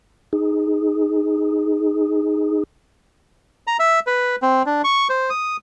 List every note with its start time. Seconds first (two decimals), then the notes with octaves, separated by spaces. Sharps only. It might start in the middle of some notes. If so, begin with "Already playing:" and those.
0.33 D#4 G#4
3.67 A#5
3.79 E5
4.07 B4
4.42 C4
4.66 D4
4.84 C#6
5.09 C5
5.30 D#6